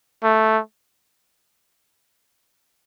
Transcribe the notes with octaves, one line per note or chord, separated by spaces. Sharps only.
A3